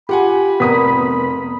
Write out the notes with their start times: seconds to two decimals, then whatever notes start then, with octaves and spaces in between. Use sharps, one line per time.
0.09 F4 G4 F#5 G#5 B5
0.60 F1 B3 A#4 A#5 D#6 B6